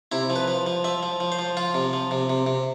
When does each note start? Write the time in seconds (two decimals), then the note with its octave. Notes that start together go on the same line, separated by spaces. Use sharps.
0.12 C3 E4
0.30 F3
0.36 B4
0.48 F3
0.67 F3
0.84 F3 E5
1.03 F3
1.20 F3
1.32 C5
1.39 F3
1.57 F3 F4
1.74 C3
1.93 F3
2.11 C3
2.29 C3
2.46 C3